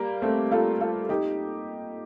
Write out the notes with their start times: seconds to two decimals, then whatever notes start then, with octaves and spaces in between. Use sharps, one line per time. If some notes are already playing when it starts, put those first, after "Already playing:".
Already playing: G3 A#3
0.22 A3 C4
0.52 F4 A4
0.81 F4 A4
1.09 D#4 G4